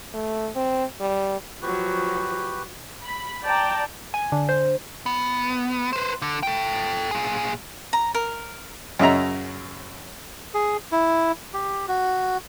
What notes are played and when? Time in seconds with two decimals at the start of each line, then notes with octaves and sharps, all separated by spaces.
0.14 A3
0.56 C4
1.01 G3
1.62 F3 F#3 F#4 G4 B4
3.03 B5
3.44 D5 G5 A5 A#5
4.14 G#5
4.32 D3
4.49 C5
5.06 B3
5.93 B4 C5
6.22 D3
6.43 A4 G5
7.11 A#2 G#4
7.93 A#5
8.15 A#4
8.99 F#2 C#3 D#5 E5 A#5
10.54 G#4
10.92 E4
11.54 G4
11.88 F#4